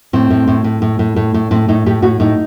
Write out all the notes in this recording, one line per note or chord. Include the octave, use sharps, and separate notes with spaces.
A2 C4
A2
A2
A2
A2
A2
A2
A2
A2 C4
A2 D#4
A2 G4
A2 F#4
A2 D#4